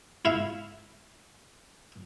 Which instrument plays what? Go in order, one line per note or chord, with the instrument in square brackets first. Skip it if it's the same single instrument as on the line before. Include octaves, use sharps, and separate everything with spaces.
[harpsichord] E4 E5 F5